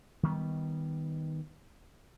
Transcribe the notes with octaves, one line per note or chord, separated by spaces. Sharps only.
D#3 G3 B3